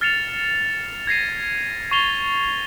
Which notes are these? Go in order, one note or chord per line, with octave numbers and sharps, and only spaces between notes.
F6 A6 C7 C#7 E7 F7
G#6 A#6 C7 D#7
C#6 A6 C7 F7 G7